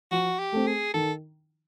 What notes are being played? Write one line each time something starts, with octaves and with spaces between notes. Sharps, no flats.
F3 F#4
G4
A3 C4
G#4
D#3 A4